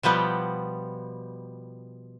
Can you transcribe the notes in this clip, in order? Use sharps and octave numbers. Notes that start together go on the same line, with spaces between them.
B2 F3 G3 B3